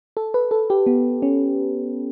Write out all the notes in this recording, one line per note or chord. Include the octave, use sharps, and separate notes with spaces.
A4
B4
A4
G4
B3
C#4